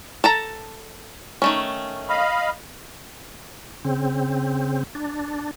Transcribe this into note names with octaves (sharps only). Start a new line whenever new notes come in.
A4 A5 A#5
D#3 A3 C#4
D#5 F5 B5
C#3 C4
D4